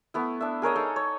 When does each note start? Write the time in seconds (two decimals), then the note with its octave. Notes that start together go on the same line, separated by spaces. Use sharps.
0.14 A3 B3 E4
0.41 D4 E5
0.62 G#4 A#4 C#5 D#5
0.76 D#4 A4
0.96 C#5